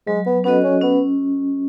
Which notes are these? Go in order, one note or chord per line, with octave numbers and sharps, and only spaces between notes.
F#3 G#3
B3
B3 C#4 F#4 A4 D#5
C#4
B3 C#4